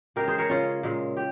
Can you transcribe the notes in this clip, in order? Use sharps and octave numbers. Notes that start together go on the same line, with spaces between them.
C#3 G#3 G4 A#4
G#4 C5
A#4 C#5
C#3 G#3 C#4 F4
A#2 G#3
G4